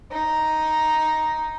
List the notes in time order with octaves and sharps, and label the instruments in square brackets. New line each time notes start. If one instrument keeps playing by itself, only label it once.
[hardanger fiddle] D#4